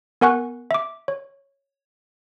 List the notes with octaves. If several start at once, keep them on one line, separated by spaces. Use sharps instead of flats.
B3 A#4 F#5 G#5 C#6 F#6
E5 D6
C#5